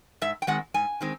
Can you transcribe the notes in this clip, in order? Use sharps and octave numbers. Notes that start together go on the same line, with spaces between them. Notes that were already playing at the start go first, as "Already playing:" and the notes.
G#2 E5
G5
D#3 G#3 C4 F#5
G#2 G#5
D#3 G#3 C4